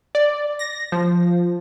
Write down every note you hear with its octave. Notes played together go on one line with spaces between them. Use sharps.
D5
A#6
F3